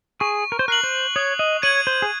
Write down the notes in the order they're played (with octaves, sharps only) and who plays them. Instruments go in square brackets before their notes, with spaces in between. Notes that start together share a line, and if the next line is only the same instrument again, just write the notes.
[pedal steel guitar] G#4 [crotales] C#6
[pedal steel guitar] A#4
C5
[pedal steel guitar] A#4 [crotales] F#6 C7 F#7
[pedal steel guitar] C5
[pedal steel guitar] C#5 [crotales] D#6
[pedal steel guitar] D#5
[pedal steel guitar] C#5 [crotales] G#6 D#7 F#7
[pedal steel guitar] C5
G#4